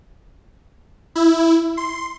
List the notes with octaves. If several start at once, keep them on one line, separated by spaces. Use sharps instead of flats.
E4
C6